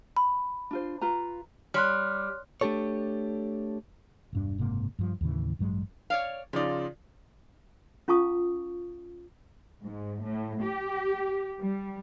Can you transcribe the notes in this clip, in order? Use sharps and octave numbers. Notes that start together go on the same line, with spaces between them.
B5
D4 F4 C5
F4 B4 A#5
G3 C#5 C6 F6 F#6
A3 D4 G4 A4 C#5
E1 G2 D4
F#1 G#2 C3 A#3
G2 F3
D#2 A2 C#3 E3
A1 G2 F#3 G#3
C#5 D5 F5
C#3 F3 D#4 F4 D5
C#4 F4 F5 A5 C#6 D#6
G#2
A2
G4
G3